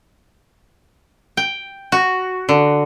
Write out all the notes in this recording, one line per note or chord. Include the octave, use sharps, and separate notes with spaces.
G5
F#4
D3